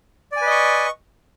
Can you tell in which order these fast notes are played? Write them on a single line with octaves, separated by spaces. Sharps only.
D5 G#5 B4 D#5 C#6